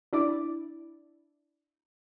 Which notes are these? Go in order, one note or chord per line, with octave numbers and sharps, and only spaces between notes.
D4 E4 D5 D6